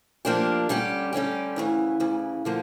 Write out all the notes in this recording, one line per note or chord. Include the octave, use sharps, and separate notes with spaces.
F3 A#3 D4 G4
D3 G3 C#4 G4
D3 G3 C#4 G4
D2 C#3 E3
D2 C#3 E3
D3 F3 A#3